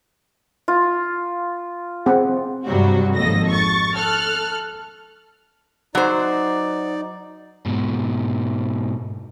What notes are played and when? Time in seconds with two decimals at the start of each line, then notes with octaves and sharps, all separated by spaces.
0.68 F4
2.06 C4 G#4 F#5
2.65 G2 C3 F#3 G3 F#4
3.16 G#1 F2 A#3 A4 D#5 A#6
3.49 C#6 A6
3.95 A4 F6 F#6
5.95 F#3 D#4 C5 D5
7.66 G#2 B2